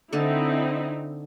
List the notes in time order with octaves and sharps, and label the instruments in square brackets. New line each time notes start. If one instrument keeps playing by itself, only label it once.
[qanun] D3 A4 [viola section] C4 D#4 E4